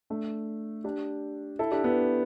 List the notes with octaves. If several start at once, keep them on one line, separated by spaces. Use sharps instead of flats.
A3 D4
D4 G4
E4 A4
D4 G4
B3 E4